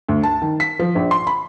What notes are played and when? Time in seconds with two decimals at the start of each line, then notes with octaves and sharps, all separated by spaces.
0.08 D2
0.23 A5
0.42 D#3
0.60 B6
0.79 F3
0.95 A#1
1.11 C6
1.27 B5